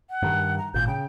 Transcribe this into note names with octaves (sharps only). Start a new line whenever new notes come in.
F#5
G2 D#3
A#5
G#1 A#2 G6
C#3 G5